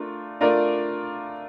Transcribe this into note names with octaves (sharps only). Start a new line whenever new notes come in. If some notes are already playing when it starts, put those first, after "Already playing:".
Already playing: A3 D4 F4 A#4
A3 D4 F4 A#4 D5